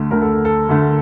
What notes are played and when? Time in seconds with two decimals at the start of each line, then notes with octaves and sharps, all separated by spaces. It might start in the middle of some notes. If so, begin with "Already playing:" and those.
Already playing: D2 D3 A3
0.11 D2 D3 A3 A#4
0.22 A4
0.45 A4
0.69 D2 D3 A3